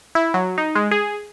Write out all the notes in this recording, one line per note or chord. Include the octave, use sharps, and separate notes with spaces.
E4
F#3
D#4
G#3
G#4